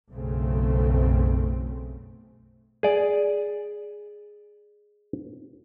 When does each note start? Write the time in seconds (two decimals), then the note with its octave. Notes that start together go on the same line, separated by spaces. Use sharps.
0.11 B1 F#2 C#3 A3 C4
2.83 G#4 D5